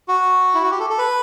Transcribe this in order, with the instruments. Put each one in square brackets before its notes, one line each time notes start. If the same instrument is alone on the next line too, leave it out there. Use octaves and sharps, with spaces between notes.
[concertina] F#4
E4
F#4
G4
A4
A4
B4